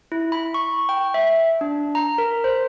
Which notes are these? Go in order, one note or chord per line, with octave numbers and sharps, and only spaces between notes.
E4
B5
C#6
G5
E5
D4
A#5
A#4
C5